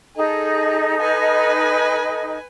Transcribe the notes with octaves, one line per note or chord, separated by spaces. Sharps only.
D#4 G#4 A4 D#5
B4 G#5